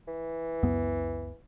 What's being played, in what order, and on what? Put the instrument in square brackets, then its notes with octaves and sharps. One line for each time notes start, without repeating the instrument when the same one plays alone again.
[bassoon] E3
[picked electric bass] C#2 F#2 B3